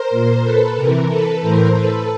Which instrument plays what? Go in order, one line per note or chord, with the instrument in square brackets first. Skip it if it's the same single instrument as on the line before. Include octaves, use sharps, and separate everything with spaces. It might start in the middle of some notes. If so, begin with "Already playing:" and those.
Already playing: [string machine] A#4 C5
A#2
A4 B4
C3 E3 A#4
A4 B4
A2 E3 A#4 C5
A4 B4